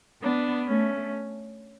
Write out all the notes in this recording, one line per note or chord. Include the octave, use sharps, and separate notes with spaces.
B3 D4
A3 C#4